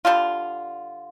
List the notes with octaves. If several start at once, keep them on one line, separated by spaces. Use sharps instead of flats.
D3 G3 D4 F4